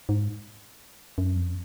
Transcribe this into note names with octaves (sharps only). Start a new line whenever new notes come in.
G#2
F#2
F2